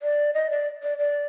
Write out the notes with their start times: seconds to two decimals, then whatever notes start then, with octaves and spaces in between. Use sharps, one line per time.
0.02 D5
0.34 D#5
0.50 D5
0.83 D5
0.98 D5